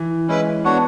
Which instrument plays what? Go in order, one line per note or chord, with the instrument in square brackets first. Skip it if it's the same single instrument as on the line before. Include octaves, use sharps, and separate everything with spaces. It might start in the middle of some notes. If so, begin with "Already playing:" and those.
Already playing: [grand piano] E3
[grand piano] G#3 [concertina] C#4 E4 B4
[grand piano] B3 [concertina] D4 F#4 C#5 F#5